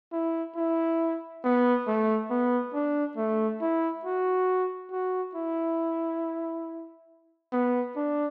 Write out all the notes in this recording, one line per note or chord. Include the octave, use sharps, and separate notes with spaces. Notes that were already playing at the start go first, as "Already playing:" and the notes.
E4
E4
B3
A3
B3
D4
A3
E4
F#4
F#4
E4
B3
D4